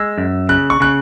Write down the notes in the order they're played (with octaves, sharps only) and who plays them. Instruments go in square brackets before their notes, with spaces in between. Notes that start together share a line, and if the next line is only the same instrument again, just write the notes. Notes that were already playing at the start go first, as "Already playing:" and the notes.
Already playing: [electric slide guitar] G#3 [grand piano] E6
[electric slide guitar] F#2
[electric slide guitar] C#3 [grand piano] F#6
[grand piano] C#6
[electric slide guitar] C#3 [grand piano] F#6